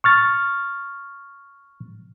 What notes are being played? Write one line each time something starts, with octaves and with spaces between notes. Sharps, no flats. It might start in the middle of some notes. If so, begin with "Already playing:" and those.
C#6 F6 A6